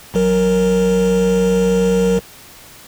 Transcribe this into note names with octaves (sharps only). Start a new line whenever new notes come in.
A1 F#3 A#4